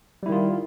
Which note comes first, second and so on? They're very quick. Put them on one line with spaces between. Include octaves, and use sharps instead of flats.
G3 E4 D#3 F4